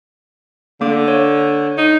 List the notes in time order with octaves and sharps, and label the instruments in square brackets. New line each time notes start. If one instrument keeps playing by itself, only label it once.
[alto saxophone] D3 [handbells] A#3 D6
[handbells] C#5
[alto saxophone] D#4